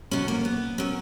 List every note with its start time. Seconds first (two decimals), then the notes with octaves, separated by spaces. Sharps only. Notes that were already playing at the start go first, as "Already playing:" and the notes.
0.11 E2 B2 F#3 C#4
0.28 A#3
0.45 B3
0.78 A#2 F#3 C#4